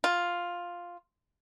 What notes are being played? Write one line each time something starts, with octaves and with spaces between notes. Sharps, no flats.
F4